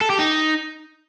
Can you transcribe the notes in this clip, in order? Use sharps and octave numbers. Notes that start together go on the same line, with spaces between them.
A4
G4
D#4